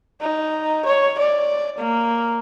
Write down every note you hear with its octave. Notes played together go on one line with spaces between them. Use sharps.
D#4
C#5
D5
A#3